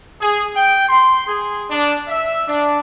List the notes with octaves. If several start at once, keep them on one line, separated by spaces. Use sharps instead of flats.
G#4
G5
C6
G#4
D4
E5
D4